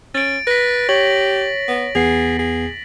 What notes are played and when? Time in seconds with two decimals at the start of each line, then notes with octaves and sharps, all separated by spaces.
0.15 C#4 A6 D7
0.47 B4 A#6 B6
0.89 G4 C#5 F#7
1.68 B3
1.95 E2 B3 G#4 C7
2.39 G#4